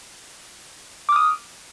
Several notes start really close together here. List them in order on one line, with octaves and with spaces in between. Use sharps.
D6 F6 D#6